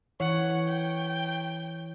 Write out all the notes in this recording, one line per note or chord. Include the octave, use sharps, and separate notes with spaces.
E3 C#5 F#5
G5